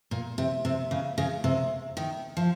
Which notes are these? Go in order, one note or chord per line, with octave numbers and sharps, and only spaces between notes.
A#2
C3
C3
C#3
C#3
C3
D#3
F3